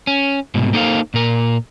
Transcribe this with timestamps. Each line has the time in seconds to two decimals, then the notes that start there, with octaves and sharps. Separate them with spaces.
0.07 C#4
0.54 C2 G#2 B2
0.73 A#3 D#4 A4 C5 F5
1.14 A#2 A#4